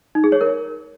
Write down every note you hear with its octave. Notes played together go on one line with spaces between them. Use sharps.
D#4
G#4
C#5
A#4